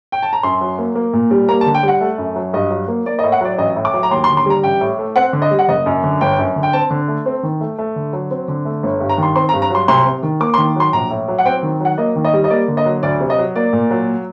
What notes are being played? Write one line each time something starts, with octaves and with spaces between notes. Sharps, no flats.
G5
A5
A#5
F#2 C6
F#3
A#3
A#3
A#2
G3
A#3 A#5
A5
D3
G5
G3 F#5
A3
F#2
F#3
G2 D#5
F#3
A#3
A#3 D5
D#5
A2
F#5
F#3 D5
A1 D#5
A2
D6
F#3
A#5
D#2 C6
C6
D3
C6
G3 A#5
A1 G5
A2
A3
C4 F#5
D3
D#5
G3
F#5
F#1 D#5
F#2
D3
G1 G5
F#2
D3
G5
C4 A5
D3
A3
C4
D#3
A3
A3
D3
F#3
C4
D3
A3
G1
G2
A#5
D#3 C6
C4 C6
A#5
G2
A#5
F#3 C6
C2 C6
C3
D#3
A#3 D6
C6
D#3
F#3 C6
A#1 A#5
A2
F#3
F#5
C4 G5
D#3
F#3 F#5
A#3 D#5
D#3
D#5
G3
D#5
A#3 D5
D3
D#5
F#3
D2 D5
C3
D#5
F#3
A#3 D5
A#2
F#3